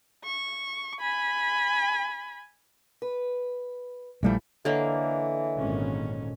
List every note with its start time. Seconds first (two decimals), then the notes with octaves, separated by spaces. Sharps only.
0.24 C#6
1.00 G#5 B5
3.02 B4
4.23 A#1 E3 F3 G3 A3 E4
4.65 D3 E3 A#3 A4 C#5 D#5
5.57 G#1 A#2 C#4